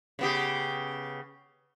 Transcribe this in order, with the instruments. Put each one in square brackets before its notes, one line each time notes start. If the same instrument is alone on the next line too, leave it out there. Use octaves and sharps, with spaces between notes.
[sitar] C#3 B3 G4